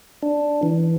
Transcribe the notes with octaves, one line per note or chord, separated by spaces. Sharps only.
D4
E3